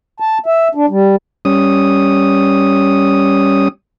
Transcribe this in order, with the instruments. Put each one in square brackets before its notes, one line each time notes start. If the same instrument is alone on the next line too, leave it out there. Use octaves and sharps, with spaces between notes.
[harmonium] A5
E5
D4
G3
[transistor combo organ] G3 C#4 D#6